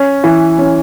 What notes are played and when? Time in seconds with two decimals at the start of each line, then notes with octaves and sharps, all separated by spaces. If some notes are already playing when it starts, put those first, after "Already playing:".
Already playing: C#4
0.24 E3
0.59 C#4